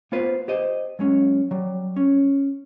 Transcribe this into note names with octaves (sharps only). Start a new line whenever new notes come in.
A#3 B3 F4 B4 C5
G4 C5 D#5
F#3 G#3 C#4
F#3 G3
C#4